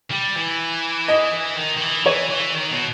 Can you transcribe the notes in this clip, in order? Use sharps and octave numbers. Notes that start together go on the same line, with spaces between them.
G3
E3
D#5
D#3
D#3
E3
E3 C#5
E3
D#3
B2